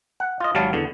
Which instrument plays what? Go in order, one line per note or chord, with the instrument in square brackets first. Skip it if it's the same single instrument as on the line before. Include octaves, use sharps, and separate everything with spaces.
[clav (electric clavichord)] F#5
F4 D#5
G#1 F#3 G3 F5 A5
E2 D3